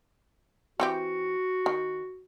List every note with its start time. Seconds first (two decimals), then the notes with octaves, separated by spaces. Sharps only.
0.80 E3 C4 F#4 G4
1.66 D#3